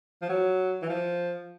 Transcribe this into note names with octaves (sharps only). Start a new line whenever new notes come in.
F3
F#3
E3
F3